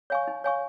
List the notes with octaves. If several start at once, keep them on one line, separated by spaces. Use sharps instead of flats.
C#5 F5 G#5 C#6
D#4
C#5 F5 G#5 C#6